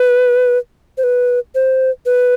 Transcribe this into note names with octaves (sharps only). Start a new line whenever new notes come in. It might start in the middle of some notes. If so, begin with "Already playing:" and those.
Already playing: B4
C5
B4
C5
B4